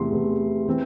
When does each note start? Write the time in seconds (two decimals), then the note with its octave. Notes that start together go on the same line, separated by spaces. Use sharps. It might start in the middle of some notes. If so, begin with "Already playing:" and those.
Already playing: E2 C3 E3 A3 C6
0.10 E2 C3 E3 A3
0.68 E3 C4